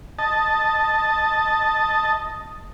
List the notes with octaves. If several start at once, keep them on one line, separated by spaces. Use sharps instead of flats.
D#5 A5